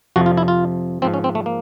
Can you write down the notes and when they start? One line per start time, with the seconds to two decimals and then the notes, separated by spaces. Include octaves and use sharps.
0.16 F2 C3 F3 F#4
0.26 F4
0.37 E4
0.48 F4
1.02 G#2 F3 C4
1.14 C#4
1.24 C4
1.35 A3
1.46 A#3